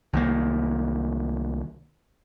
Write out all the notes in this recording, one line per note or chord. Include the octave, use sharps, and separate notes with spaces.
C2 D#3 A#3